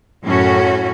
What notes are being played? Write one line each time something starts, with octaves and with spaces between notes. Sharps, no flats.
F#2 A2 C#4 F#4